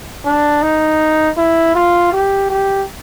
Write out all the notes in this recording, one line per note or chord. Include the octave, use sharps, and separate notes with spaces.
D4
D#4
E4
F4
G4
G4